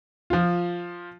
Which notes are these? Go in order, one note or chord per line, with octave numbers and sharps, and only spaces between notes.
F3 F4